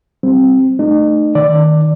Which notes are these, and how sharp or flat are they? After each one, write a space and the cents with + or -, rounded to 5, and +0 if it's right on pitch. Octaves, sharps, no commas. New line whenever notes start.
G3 -10 C4 +0
A3 +0 D#4 -40
D#3 +0 D5 +0